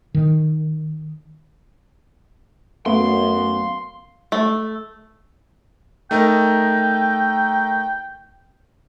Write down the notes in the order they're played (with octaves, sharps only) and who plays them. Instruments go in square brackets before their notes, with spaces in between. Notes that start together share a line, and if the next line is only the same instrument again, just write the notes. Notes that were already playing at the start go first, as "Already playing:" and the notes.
[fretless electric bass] D#3
[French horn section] F#2 [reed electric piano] A3 B3 [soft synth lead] F5 [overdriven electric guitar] C6
[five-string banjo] A3
[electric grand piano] A3 D#4 A#4 [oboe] G5